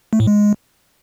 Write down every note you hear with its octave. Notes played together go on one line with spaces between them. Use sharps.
A3
A2
G#3